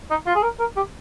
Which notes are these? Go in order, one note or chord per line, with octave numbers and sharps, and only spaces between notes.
D#4
F4
G#4
A#4
A#4
G4